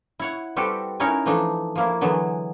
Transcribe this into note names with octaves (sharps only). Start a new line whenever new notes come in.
E4 C#5 F#5
G3 C4 F#4 G4 A4 B4
C#4 D#4 E4 F#4 A#4 C#5
E3 F3 A3 D4 D#4
F3 A#3 E4
D3 E3 F#3 G#3 B3